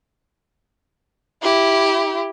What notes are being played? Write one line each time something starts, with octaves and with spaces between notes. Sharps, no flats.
E4 G4